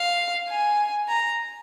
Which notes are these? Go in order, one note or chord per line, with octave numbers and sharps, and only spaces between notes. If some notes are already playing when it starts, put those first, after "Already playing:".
Already playing: F5
G#5
A#5